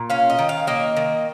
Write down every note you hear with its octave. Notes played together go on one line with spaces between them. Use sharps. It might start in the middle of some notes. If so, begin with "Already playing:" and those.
Already playing: A#2
C#4 F5
D#5
D#3
F5
A#3 D#5
D#3